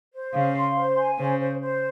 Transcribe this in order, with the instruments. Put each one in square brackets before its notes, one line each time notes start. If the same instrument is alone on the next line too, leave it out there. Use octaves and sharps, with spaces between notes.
[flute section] C5
[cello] C#3 [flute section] F5
[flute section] C6
C5
G#5
[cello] C#3 [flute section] C5
[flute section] C5
C5